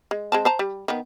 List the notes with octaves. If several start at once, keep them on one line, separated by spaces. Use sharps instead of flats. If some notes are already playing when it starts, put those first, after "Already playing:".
G#3
G#3 C4 A5
C5 A5 A#5
G3
D#3 B3